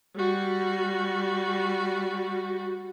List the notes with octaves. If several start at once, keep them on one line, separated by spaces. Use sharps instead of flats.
G3 F#4